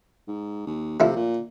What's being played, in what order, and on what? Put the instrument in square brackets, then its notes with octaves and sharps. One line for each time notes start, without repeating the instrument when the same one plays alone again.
[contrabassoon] G#2
D#2
[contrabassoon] C3 [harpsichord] F3 A3 E4
[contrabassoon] A#2